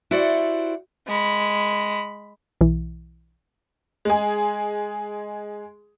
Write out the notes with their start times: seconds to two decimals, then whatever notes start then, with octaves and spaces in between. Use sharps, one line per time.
0.11 E4 F#4 G4 C5 D5 F#5
1.07 G#3 B5
2.61 B1 E3
4.05 G#3 G#4